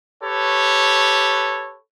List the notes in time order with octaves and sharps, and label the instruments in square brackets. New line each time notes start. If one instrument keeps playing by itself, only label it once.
[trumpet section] G4 A4 B4 C#5